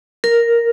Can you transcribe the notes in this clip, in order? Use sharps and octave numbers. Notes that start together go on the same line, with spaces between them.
A#4